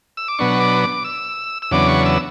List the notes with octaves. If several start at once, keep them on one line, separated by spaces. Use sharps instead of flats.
E6
D6
B2 F#3 B3 D4 C#6
D6
D6
E6
E6
E2 C#3 F#3 B3 D4 D6
C#6
E6